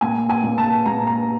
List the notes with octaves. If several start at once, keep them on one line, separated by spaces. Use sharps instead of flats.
A#2 G#5
G#5
A#2
A5
A#2 A#5
A#5